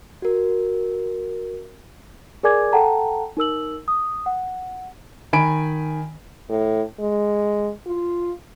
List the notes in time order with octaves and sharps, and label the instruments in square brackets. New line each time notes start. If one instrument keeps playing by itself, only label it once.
[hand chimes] F#4 A#4
[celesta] G#4 A#4 D5 G#5 D6 G#6
A4 F#5 G5 A5 A#5
D#4 A#4 E6 F#7
D#6
F#5
[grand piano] D#3 G#5 B5 D7
[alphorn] A2
G#3
F4